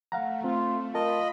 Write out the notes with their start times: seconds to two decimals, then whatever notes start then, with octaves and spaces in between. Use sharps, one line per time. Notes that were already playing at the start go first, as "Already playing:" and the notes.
0.12 A3 F5 F#5 A#5
0.44 C4 F4
0.95 F4 A#4 D#5 A5 B5